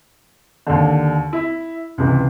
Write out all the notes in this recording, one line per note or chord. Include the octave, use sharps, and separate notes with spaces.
D#2 D3
E4
C#2 C3 E3